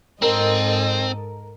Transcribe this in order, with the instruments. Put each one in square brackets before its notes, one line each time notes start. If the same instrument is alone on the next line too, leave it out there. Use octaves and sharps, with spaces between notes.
[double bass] G#2 [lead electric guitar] C4 [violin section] A4 D#5 [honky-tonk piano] A#4